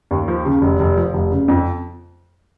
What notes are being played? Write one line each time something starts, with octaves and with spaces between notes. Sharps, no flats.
D#2
F3
C#3
F1
F1
F3
F1
C#3
F2